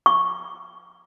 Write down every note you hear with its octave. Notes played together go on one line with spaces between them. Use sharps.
C#6